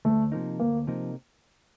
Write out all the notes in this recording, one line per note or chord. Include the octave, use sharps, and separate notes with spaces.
D2 A3
C3 F3 A#3 D#4
D2 A#3
C3 F3 A#3 D#4